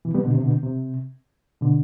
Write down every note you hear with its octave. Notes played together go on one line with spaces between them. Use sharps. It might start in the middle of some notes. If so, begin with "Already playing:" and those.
C3 E3
G3 B3
B2 D3
C3
B2 D3
C3
B2 D3